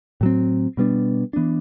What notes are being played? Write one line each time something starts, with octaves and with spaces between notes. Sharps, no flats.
A2 F#3 C4
B2 G3 B3 D4
E3 B3 D4